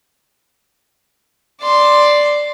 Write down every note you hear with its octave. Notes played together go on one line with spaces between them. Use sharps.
D5 C6